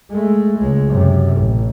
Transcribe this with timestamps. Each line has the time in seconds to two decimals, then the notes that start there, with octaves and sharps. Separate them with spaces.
0.11 G#3 A3
0.58 C#2 G#3
0.89 F#2 C3
1.37 A1